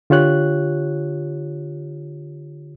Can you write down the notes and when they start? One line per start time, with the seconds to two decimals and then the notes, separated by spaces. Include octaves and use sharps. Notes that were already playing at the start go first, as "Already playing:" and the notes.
0.10 D3 F4 G4 C#5 F#6